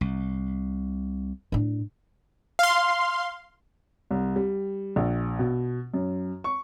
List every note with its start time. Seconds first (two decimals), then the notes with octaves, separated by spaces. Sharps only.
0.01 C2
1.52 A2 D4
2.59 F5 C6
4.11 C2
4.36 G3
4.96 A#1
5.39 B2
5.94 F#2
6.44 C#6